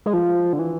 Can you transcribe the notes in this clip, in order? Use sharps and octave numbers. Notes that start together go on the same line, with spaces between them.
G#3
F3
D3
E3